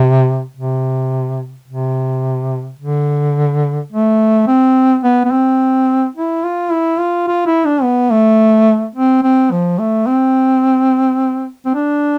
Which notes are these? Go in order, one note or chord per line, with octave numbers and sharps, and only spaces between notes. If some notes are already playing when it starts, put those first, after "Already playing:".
Already playing: C3
C3
C3
D3
A3
C4
B3
B3
C4
E4
F4
E4
F4
F4
E4
D4
B3
A3
C4
C4
F3
A3
C4
C4
D4